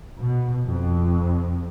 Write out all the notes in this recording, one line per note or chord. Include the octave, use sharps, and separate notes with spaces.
B2
F2